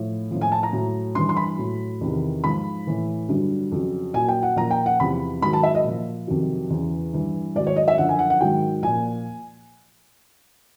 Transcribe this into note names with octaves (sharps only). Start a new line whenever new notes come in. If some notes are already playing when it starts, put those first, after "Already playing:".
Already playing: A2 F3
A2 F3
G#5
A5
A#5
A2 F#3
G2 E3 C6
C6
B5
A2 F#3
E2 C3 D#3
G#2 F3 B5
A2 E3
G2 D3 F#3
F2 C#3 F#3
A#2 F#3 G#5
G5
F#5
A#2 F3 A#5
G5
F#5
E2 C3 F3 B5
G#2 D#3 F#3 B5
A5
E5
D#5
A#2 F3
F2 C3 D#3 F#3
E2 C#3 E3
G2 E3
G#2 D#3 F#3 D5
C#5
D#5
E5
F#2 D3 F3 F#5
G#5
F#5
F#5
G#2 D#3 F#3 G5
A#2 F3 G#5